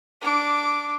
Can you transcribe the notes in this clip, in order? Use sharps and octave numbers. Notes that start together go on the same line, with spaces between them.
D4 D6